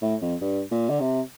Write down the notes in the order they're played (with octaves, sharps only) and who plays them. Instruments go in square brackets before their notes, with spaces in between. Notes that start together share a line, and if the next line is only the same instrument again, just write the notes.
[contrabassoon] A2
F2
G2
A#2
D3
C3